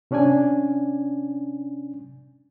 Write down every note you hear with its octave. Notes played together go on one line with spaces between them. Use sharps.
C3 C#4 D4 D5 G#5